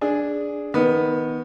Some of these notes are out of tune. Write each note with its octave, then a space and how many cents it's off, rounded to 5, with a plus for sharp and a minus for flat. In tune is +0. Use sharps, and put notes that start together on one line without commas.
D4 -5 G#4 +0
D#3 +20 B3 +0